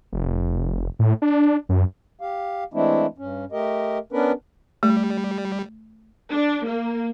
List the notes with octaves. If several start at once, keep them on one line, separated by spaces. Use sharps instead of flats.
F1
A2
D4
F#2
G4 F5
E3 G#3 A3 C4 D4 E4
G2 C#4
A3 G4 A#4 D#5
B3 C#4 D4 A#4 B4
G3 A3
D4
A#3